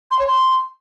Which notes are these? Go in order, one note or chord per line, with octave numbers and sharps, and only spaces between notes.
C6
C#5
C6